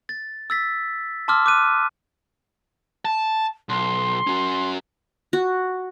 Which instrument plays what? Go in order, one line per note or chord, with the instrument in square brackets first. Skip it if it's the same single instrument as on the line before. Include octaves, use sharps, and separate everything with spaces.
[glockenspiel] A6
E6 A6 B6
A5 C6 D6 E6 F6
D6 F#6 D#7
[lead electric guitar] A5
[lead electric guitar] B1 [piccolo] C6
[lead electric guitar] C#4 F#4
[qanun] F#4